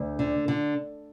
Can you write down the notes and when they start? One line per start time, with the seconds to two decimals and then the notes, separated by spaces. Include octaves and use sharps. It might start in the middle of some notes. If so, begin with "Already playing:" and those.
Already playing: D2
0.19 D3
0.48 D3